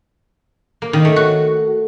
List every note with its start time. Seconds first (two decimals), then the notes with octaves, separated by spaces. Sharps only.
0.82 A#3
0.93 D#3
1.05 A3
1.16 F#4